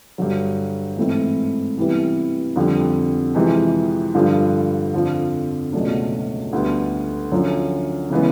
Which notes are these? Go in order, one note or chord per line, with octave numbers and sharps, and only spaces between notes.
G2 D3 F#3
G#2 E3 A3 C4 E4
C3 E3 G3 B3 E4
F2 D3 G3
F2 C3 E3 G#3
G2 D3 F3
F2 D3 F3
C#2 B2 F#3 A3 D4
D2 D3 G3 B3
F#2 D3 F3
C#3 E3 G#3 B3